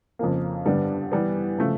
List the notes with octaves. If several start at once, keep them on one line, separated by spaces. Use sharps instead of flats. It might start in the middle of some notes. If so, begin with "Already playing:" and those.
F2 C#3 F3 A#3
G2 D3 G3 B3 D4
E3 G3 B3
C#3 F3 A3